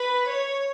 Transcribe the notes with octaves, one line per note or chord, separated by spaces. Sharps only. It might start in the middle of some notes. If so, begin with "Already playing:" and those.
Already playing: B4
C#5